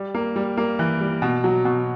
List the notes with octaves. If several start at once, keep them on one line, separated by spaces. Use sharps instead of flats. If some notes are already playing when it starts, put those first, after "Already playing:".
Already playing: G3
A#3
G3
A#3
E3
G3
B2
F#3
B2